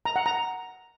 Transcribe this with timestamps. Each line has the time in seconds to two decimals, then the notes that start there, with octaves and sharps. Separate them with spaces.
0.05 A#5
0.16 F#5
0.26 A#5